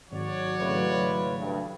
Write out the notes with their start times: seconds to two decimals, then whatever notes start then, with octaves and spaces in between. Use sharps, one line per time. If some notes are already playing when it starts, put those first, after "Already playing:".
0.12 G#1 F#3 F#4 C#5 D5
0.60 G#1 C#3 A3 E4 F4 B4
1.38 D2 G2